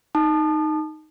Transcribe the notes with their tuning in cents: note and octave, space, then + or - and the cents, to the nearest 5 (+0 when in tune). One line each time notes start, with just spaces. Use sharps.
D#4 +0 A5 -10 D#6 -40